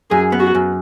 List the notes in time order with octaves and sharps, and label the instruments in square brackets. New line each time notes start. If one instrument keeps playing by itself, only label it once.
[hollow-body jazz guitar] F#2 [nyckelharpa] G#4
[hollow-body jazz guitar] B3
[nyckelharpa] F#4
[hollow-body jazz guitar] F#2